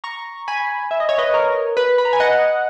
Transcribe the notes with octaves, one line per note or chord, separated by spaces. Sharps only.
A#5 C#6
G#5 B5
E5
D#5
C#5
B4 D#5
A#4 C#5
B4
B5
A#5
G#5
D#5 F#5